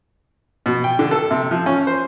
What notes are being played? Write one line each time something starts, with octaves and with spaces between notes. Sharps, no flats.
B2
G5
D3
A4
C3
F3
C#4
C5